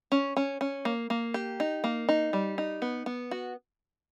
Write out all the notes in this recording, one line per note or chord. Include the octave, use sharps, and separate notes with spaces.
C#4
C#4
C#4
A#3
A#3
G4
D#4
A#3
D#4
G3
D#4
B3
B3
F#4